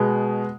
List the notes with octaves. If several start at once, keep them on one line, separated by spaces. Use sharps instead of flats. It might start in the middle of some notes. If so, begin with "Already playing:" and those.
Already playing: B2 G#3 B3